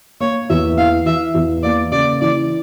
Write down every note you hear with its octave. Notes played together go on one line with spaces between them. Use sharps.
A#3 C#5
E2 E5
E3 F5
E3 E5
E2
A#3 D5
C#3 D5
E3 D5